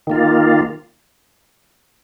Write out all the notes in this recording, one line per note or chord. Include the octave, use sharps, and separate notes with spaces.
D#3 A#3 F4